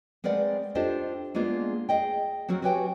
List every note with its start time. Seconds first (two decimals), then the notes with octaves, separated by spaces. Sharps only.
0.24 G#3 C4 A#4 B4 D5 F#5
0.75 D4 F4 G4 A4 C5 D#5
1.35 G#3 A#3 B3 D4 F4 G#4
1.89 G#4 D#5 G5
2.48 F#3 C4 F#4 A#4
2.62 F#4 G4 B4 C#5 G5 G#5